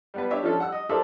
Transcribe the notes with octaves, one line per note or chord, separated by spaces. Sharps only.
G3 B3 B4
D4 G4 C#5 E5
F3 C#4 D4 A4
G3 F#5 E6
D#5
A4 A#4 C5 D5 E5 A5